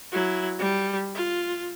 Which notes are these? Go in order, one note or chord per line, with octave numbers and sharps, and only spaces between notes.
F#3 E4
G3
F4